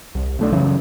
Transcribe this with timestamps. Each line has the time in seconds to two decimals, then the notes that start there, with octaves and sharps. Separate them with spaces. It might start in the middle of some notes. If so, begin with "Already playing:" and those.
0.15 C2
0.39 B1 A3 D4
0.52 F#2 C#3 E3 F#3